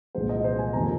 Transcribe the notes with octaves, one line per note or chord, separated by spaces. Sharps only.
C2 A#2 F3 G#3 C5
D#5
C5
G#5
F2 C3 D#3 A#3 A#5